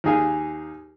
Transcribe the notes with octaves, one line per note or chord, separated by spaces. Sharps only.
D#2 D#4 G#4 F5 G#5